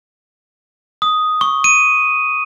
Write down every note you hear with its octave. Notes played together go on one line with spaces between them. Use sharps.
D#6
C#6
D#7